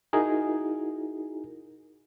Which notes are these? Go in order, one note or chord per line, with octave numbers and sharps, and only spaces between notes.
D#4 E4 F#4 G#4 A#4